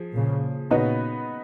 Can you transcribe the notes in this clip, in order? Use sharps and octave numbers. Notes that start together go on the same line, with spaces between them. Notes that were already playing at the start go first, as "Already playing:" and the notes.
Already playing: F3 G#4
A#2 C#3
A#2 C#3 B3 D#4 F#4 B4